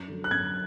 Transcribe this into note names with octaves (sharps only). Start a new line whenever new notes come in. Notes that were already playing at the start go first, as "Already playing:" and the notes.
Already playing: F#2
D3 F#3
F#6
F#2 G#6